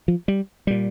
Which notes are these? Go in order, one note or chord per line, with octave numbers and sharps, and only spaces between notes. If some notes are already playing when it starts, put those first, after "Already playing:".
F3
G3
A#2 G3